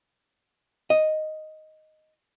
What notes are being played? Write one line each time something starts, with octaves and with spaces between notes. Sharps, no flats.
D#5